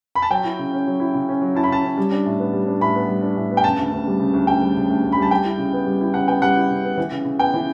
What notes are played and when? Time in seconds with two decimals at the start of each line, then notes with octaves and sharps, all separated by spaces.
0.15 B5
0.22 A5
0.30 F#3 G5
0.44 E4
0.59 C#3
0.73 C#4
0.86 F#3
1.00 E4
1.14 C#3
1.29 C#4
1.42 F#3
1.55 E4 A5
1.63 B5
1.69 C#3 A5
1.83 C#4
1.97 G3
2.12 D4
2.26 A2
2.39 B3
2.53 G3
2.67 D4
2.81 A2 B5
2.95 B3
3.08 G3
3.22 D4
3.37 A2
3.51 B3
3.57 G5
3.64 C#3 A5
3.78 D2
3.92 D2
4.07 G3
4.19 C#3
4.33 D2
4.47 D2 G5
4.62 G3
4.76 C#3
4.90 D2
5.04 D2
5.12 B5
5.17 G3
5.22 A5
5.31 G3 G5
5.44 E4
5.58 C#3
5.73 B3
5.87 G3
6.01 E4
6.14 C#3 F#5
6.28 B3 G5
6.42 G3 F#5
6.56 E4
6.71 C#3
6.84 B3
6.97 E3
7.11 C#3
7.25 C#3
7.39 B3 G5
7.54 E3